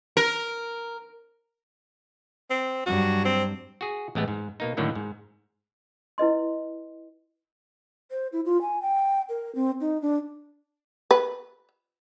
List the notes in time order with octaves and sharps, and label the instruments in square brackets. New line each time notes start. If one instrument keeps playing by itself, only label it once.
[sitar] A#4
[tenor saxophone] C4
[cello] G2 F#3 [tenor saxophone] F#4
[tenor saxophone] C4
[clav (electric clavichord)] F#4 G#4
A1 G#3 A3 B3
G#2
B2 A#3 D#4
A2 D3 D#3 F#3 A#3
G#2
[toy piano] E4 B4 D#5 C6
[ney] C5
E4
F4
G#5
G5
A#4
C4
D#4
D4
[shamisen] B4